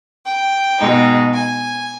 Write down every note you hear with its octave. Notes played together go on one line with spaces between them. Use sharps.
G5
B2 G#3 D#4
G#5